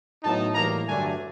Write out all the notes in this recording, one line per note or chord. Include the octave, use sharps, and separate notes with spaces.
A2 F#3 B3 D#4 A5
A2 E3 G3 A#3 A#5
G2 D3 F#3 A3 D4 G#5